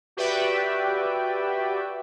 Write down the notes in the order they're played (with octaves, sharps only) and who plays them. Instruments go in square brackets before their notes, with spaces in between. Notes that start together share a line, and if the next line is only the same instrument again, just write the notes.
[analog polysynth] F#4 G4 B4 D5 E5 G5